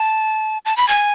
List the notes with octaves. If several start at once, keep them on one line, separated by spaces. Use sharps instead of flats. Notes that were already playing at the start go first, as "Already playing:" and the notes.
Already playing: A5
A5
B5
G#5